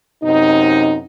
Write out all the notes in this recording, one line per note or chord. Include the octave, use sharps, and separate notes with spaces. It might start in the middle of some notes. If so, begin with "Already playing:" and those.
F#2 C3 D#4